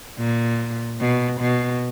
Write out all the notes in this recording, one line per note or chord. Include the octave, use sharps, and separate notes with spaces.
A#2
B2
B2